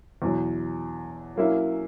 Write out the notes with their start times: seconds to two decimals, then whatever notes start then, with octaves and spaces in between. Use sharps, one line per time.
0.22 E2 B2 F#3
1.36 F#3 A#3 C#4 E4